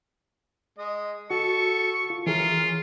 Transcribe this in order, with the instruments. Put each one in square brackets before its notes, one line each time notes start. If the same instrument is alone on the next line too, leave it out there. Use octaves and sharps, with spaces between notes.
[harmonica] G#3 D#5
[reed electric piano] F#4 [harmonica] A4 [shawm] C#6
[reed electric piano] F4
[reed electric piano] E3 G#4 [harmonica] C#4 A#4 [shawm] F4